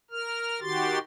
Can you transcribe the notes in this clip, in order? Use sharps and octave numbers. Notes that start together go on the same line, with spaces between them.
A#4 F6
D#3 F#4 G4 C6 A6